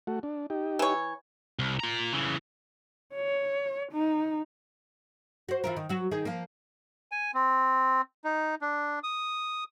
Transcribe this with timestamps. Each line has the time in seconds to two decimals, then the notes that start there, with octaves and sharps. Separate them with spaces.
0.07 A3 F#4
0.23 D4
0.50 D#4 G4
0.79 E3 C#5
1.59 C2
1.80 F4 A#5
2.13 C#3 E3
3.15 C#5
3.92 D#4
5.49 F#4 C5
5.64 E3 F4 A#4
5.76 D#3
5.89 F#3 F#4
6.11 D#3 D#4 G#4
6.25 F3 A#3
7.12 G#5
7.34 C4
8.24 D#4
8.61 D4
9.03 D#6